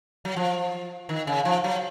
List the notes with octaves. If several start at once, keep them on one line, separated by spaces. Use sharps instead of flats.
F#3
F3
D#3
C#3
F3
F#3